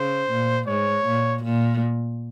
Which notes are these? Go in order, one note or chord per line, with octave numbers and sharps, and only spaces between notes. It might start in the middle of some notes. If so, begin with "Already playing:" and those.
Already playing: C#3 C5
A#2
G#2 C#5
A#2
A#2